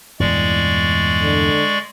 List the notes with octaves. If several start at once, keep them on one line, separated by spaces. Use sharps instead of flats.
E2 G2 A#2 G#3 D5 C#6
D3